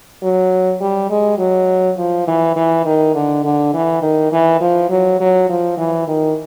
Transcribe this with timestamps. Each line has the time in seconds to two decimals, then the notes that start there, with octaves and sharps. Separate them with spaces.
0.22 F#3
0.81 G3
1.10 G#3
1.39 F#3
1.97 F3
2.27 E3
2.56 E3
2.85 D#3
3.14 D3
3.44 D3
3.73 E3
4.02 D#3
4.32 E3
4.60 F3
4.90 F#3
5.20 F#3
5.49 F3
5.77 E3
6.07 D#3